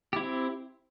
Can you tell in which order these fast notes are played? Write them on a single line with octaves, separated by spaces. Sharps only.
G4 E4 C4